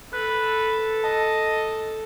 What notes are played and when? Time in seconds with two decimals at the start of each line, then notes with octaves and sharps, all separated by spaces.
0.13 A4 B4 F#6
1.04 D#5 A5